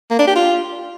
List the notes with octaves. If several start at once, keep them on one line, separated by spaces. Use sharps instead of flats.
A#3
D4
G4
F4